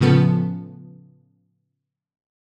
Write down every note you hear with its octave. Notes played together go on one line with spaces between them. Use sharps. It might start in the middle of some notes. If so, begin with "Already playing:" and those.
A2 C#3 F3 B3 A4